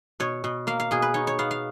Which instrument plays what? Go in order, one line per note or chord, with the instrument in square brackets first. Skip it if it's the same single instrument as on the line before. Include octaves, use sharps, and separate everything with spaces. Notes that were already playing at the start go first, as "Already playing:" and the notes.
[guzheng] B2 C#5
B2
A#3 F5
F5
B2 G#4
B4
D#4 C#5
C#5
B3 F5
F5